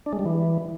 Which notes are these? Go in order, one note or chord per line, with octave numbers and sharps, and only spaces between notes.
D4
G#3
G3
E3